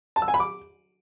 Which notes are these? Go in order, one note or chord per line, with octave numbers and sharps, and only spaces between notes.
A5
E6
G#5
B5
D6